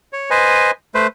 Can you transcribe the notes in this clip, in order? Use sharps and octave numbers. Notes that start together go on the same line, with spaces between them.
C#5
B4 C5 D#5 G#5
A3 B4 C5